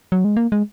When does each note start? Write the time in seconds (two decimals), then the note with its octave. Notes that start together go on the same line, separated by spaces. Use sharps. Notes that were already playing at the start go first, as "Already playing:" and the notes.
0.12 F#3
0.24 G#3
0.36 A#3
0.52 G#3